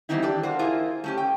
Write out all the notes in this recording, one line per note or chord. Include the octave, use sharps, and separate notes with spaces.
E3 G3 B3 C4 D#4 E4
D4 G4 A4 D5
A#3 F#4 C5
E4 F4 G#4 A#4 C5
A3 C#4 G4
G5